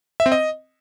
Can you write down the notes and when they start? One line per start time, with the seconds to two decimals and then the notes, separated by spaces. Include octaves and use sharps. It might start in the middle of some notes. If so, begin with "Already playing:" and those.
0.20 E5
0.26 C4
0.32 D#5